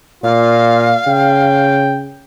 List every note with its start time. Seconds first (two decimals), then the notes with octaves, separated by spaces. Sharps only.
0.23 A#2 F4 F5
1.07 C#3 G5